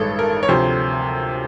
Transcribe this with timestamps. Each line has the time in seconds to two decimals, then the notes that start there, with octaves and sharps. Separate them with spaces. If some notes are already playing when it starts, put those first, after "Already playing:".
Already playing: A1 G2 D#3 G#3 A4
0.19 A#4
0.43 C#5
0.49 D2 C3 F3 C5